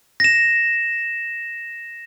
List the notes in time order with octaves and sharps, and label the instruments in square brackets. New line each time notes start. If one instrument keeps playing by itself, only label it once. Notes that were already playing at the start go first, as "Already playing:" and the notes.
[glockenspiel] A#6 E7